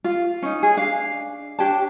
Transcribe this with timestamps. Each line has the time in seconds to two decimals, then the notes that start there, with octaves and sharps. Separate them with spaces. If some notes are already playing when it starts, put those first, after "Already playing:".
0.04 F4
0.43 C#4 D#4
0.63 G#4
0.77 D4 F5
1.59 D4 G4 C#5 A5